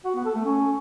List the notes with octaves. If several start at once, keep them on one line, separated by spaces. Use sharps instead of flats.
F#4
B3
A4
A3
C#4